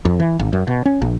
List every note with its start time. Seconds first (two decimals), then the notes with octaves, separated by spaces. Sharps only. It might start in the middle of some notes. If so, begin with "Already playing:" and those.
0.05 F2
0.20 E3
0.39 G#1
0.53 F#2
0.67 B2
0.85 C#4
1.02 A#1